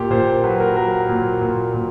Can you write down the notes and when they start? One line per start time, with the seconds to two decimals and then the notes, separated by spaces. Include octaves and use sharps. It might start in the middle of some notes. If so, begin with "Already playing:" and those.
Already playing: A#2 G4
0.11 A#2 C5
0.44 F#3 B4
0.60 A#4
0.76 F#3 A#4
1.09 A#2
1.42 A#2
1.74 A#2